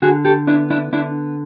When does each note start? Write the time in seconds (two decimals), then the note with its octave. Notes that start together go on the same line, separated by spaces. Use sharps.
0.02 D3 F#4 G#4
0.25 G4 A4
0.47 B3 D4 E4
0.70 D4 E4
0.93 D3 D4 E4